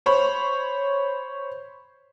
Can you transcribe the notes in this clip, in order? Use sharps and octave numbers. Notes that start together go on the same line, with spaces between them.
C5 C#5 B5